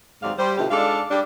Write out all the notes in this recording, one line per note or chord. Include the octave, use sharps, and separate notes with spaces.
D#2 G#2 F#3 C4 D5 F5
G3 C5
B2 D3 A3 D#4 F4 G4
G#2 G#3 D4 A4 D5 F5
G3 D4